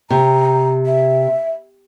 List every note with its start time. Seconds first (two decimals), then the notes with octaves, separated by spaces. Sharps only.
0.10 C3 A#5
0.86 E5